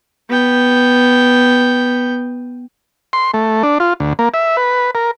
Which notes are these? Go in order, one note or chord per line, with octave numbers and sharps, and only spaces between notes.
B3 G5
C6
A3
D4
F4
D2
A#3
E5
B4
A#4